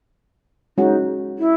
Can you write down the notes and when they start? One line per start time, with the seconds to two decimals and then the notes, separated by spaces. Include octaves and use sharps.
0.77 G#3 C#4 D#4 F#4
1.38 E4